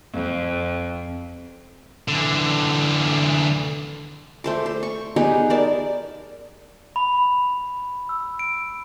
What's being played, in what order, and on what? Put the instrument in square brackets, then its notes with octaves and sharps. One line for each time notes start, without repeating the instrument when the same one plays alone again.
[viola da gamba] F2
[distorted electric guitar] D3 E3
[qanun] A3 C5 D6
C5
C#6
B3 D#4 G4 G#4
A#4 D5 A5
[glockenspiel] B5
E6
D7